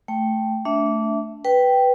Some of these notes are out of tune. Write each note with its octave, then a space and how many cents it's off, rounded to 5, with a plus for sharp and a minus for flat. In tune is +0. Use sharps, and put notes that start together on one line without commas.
A3 +0 G5 +0
A3 +0 D4 -25 E5 +0
B4 +0 G5 -5